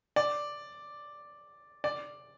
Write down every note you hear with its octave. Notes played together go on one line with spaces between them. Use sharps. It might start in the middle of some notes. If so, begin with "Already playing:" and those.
D5
D5